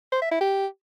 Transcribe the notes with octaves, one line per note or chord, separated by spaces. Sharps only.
C5
E5
E4
G4